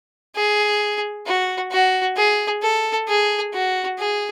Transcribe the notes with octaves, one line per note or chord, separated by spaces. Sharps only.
G#4
F#4
F#4
G#4
A4
G#4
F#4
G#4